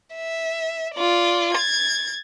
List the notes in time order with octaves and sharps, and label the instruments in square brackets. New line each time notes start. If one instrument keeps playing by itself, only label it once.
[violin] E5
F4 D5
G#6 A6